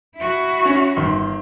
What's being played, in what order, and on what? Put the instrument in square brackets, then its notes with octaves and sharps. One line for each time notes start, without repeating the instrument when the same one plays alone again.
[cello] E4 F#4
[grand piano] C#4
G1 D#3 C6